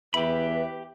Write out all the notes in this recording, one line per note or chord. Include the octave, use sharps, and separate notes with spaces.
E2 G4 B4 E5 B5